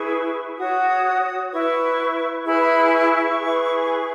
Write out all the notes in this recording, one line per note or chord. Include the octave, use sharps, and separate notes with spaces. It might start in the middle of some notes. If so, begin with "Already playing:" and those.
Already playing: E4 G#4 B4 C#6
F#4 C#5 D#6
E4 B4 C#6
E4 G#4 B4 B5
C#6
E4 G#4 B4